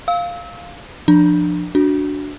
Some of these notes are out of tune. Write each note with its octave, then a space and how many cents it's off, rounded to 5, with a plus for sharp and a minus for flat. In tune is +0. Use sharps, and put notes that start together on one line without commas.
F5 +0 E6 -30
F3 +0 D4 +20 A#5 +0
D4 -5 F#4 +0